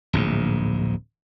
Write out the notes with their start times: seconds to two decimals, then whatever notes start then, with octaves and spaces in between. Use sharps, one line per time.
0.13 D1 A#1 G#2